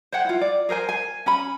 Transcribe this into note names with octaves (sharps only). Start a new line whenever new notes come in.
C5 C#5 F#5 G5
E4 F4
D5
G#4 A#4 C5 G#5
G#5
C#4 G#5 B5